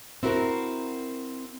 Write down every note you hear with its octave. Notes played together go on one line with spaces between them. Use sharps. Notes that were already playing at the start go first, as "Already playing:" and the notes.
C4 E4 F#4 A#4